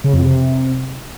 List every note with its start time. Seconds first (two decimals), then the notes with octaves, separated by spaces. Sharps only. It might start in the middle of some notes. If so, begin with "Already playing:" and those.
0.04 C#3
0.13 F2
0.22 C3